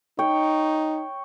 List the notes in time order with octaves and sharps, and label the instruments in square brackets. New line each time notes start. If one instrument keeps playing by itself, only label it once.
[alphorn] D#4 [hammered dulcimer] C#5 G5